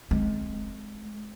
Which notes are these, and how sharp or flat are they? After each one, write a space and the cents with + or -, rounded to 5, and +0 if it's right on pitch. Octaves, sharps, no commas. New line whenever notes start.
G#3 +20 C4 +0